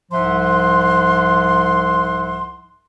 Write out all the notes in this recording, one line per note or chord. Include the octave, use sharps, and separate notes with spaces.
C2 G#2 F3 E5 F#5 C6